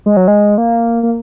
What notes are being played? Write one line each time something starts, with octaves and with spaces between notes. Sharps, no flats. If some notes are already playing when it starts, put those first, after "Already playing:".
G#3
F#3
G#3
A#3
A#3